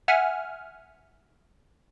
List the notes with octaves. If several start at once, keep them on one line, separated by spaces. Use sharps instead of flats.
E5 F#5 G#5 F6